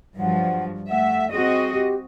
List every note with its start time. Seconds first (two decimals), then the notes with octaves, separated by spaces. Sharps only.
0.19 G2 F3 F#3 F#5
0.90 A3 E5 F#5
1.32 C4 F#4 G#4 D#5
1.73 G4